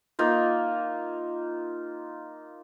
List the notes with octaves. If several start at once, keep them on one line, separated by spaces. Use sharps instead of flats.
A#3 D#4 F4